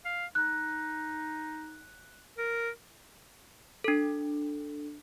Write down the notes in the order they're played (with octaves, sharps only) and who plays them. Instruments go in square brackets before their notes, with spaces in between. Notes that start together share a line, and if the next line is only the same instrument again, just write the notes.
[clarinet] F5
[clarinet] D#4 [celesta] F#6
[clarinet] A#4
[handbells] D4 A4